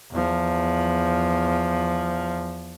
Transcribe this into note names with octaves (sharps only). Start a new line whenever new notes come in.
E2 F3